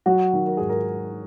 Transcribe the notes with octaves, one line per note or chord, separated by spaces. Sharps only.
F#3 F#4
D#3
A#4
G#2 G#4
A#4